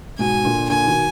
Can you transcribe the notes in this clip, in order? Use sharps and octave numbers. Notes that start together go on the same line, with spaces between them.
G#2 B2 G#5
A#2 D3
A#2 D3 G#5
B2 D#3